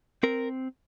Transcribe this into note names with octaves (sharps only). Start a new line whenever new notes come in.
C4 A#4